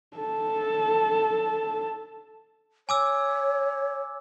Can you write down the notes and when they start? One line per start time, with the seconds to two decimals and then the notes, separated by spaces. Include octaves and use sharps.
0.17 A4 A5
2.89 C#5 G#5 D6 E6